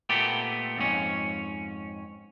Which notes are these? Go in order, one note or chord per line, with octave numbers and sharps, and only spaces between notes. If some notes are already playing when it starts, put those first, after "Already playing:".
A#2 A3 B3 G4
F2 G#2 C#4